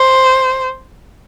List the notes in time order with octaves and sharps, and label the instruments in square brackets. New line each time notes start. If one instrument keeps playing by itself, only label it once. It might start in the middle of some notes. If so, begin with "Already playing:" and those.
Already playing: [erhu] C5